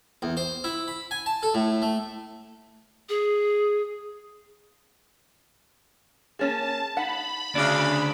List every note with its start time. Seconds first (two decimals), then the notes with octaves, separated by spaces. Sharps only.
0.22 E2
0.37 C5
0.64 E4
0.88 B5
1.11 G#5
1.26 A5
1.43 A4
1.54 A2
1.82 A3
3.09 G#4
6.39 A#3 C#4 G#4 A5
6.97 D#4 F#5 B5
7.55 D2 C#3 D4